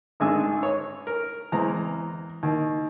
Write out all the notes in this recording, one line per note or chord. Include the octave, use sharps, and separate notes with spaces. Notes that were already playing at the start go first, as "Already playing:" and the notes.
G#1 G#3 D4 G#5 E6
C#5
A#4
E2 G#3 C4 A#5
D#2